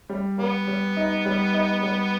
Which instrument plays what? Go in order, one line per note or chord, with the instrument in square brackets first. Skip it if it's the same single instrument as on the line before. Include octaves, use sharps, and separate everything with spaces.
[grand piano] G3
[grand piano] G3 [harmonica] B3
[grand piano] G3
D#4
G3
D#4
G3